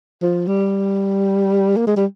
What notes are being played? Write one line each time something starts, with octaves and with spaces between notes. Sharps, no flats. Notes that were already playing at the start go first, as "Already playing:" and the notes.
F3
G3
A#3
G#3
G3